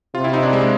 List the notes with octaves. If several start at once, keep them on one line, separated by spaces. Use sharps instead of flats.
C3 F4
E4
D#4
D4
G#3